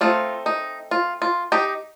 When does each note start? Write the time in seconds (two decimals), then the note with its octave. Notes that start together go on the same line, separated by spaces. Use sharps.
0.01 A3 C4 D#4 F4
0.46 D#4
0.91 F4
1.22 F4
1.52 D#4 G4